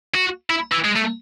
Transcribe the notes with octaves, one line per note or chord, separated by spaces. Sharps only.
F#4
E4
E3
G#3
A3